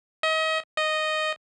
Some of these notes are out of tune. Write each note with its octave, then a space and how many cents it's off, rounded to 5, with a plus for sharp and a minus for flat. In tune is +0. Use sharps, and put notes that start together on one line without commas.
D#5 +35
D#5 -5